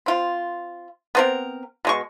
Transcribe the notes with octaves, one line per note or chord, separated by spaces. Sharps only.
C4 F4
B3 C4 A#4
B2 G#3 C#6